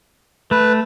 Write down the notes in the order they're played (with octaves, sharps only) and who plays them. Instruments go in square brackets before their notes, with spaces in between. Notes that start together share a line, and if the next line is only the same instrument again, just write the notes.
[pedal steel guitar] A3 [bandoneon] B4